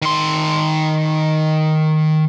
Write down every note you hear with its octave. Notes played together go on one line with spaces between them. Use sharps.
D#3 C6